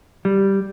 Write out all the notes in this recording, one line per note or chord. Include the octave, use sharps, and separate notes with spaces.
G3